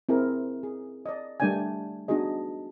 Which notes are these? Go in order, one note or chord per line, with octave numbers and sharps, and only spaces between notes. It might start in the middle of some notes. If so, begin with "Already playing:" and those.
C4 E4 G#4 A#4
G#4
D5 D#5
G3 A3 D4 D5 G5 G#5
B3 D4 D#4 F#4 G#4 D#5